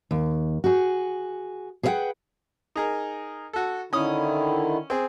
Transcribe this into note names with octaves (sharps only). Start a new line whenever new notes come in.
D#2
F#4 G#4
G#4 B4 C5 E5 F#5 G5
D#4 G#4 A#4
F#4 A4
D3 D#3 C#4 E4 D#6
C4 G#4